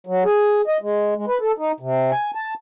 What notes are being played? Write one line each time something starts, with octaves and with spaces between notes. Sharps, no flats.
F#3
G#4
D#5
G#3
G#3
B4
A4
D#4
C3
G#5
A5